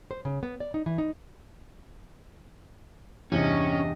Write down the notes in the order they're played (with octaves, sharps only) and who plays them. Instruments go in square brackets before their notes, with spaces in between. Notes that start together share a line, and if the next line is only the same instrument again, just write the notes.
[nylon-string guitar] C5
C#3
B3
D5
D#4
E3
D#4
[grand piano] E2 C3 [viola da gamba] G2 G3 D#5 [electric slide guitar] C#4